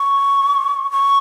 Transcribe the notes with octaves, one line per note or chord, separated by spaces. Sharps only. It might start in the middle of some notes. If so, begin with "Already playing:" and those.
Already playing: C#6
C#6